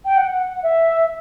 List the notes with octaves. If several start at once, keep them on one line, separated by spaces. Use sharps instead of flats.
G5
F#5
E5